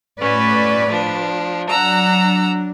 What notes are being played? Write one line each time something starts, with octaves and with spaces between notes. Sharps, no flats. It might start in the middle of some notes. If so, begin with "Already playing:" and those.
A2 C#4 F#4 B4 D5
F3 D4
F#3 D4 F#5 A#5 E6